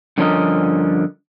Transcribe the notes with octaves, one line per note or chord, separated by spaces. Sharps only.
G2 D3 F3 C#4 A#4 D#5